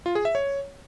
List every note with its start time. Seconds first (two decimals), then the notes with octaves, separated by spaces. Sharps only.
0.06 F4
0.15 G#4
0.25 E5
0.35 C#5